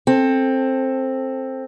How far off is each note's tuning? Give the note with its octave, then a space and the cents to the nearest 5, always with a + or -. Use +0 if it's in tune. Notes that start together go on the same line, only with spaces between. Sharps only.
C4 +10 A4 +0